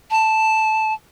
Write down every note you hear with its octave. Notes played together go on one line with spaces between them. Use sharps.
A5